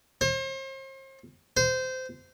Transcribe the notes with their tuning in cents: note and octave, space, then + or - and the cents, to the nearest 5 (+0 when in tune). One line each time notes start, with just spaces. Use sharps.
C5 +40
C5 -20